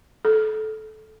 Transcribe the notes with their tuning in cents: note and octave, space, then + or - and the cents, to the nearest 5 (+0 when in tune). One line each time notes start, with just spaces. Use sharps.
A4 -20